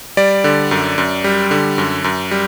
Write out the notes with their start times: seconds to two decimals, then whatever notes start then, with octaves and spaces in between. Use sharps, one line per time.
0.17 G3 D5
0.44 D3
0.71 F#2
0.98 F#2
1.24 G3
1.51 D3
1.78 F#2
2.04 F#2
2.31 G3